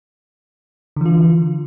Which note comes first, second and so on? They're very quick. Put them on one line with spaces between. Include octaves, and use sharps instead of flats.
D3 E3 F4